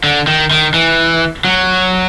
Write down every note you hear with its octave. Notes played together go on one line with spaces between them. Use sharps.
D3
D#3
D#3
E3
F#3